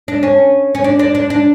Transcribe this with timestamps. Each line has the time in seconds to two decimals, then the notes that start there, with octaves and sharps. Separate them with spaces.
0.08 D4
0.23 C#4
0.75 C#4
0.84 D4
0.99 D4
1.15 D4
1.30 D4